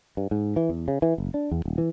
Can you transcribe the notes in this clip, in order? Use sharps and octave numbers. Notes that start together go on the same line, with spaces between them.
G2
G#2
E3
E2
C#3
E3
F#1
D4
E2
D#1
E3